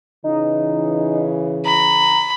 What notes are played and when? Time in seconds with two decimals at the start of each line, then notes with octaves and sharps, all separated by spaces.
0.24 C#3 E3 D#4
1.65 A#5 B5